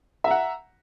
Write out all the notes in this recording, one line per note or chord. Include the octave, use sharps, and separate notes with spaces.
E5 F#5 A#5